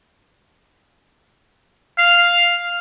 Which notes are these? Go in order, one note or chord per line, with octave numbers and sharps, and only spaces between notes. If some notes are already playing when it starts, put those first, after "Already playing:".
F5